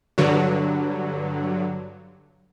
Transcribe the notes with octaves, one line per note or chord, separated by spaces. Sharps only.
G2 D3 F#3